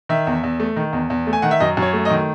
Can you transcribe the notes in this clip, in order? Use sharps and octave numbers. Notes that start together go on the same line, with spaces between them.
D#3 E5
E2
E2
A3
D#3
E2
E2
A3
G#5
D#3 F#5
E5
F#2 D#5
F#2
C#5
A3
D#5
D#3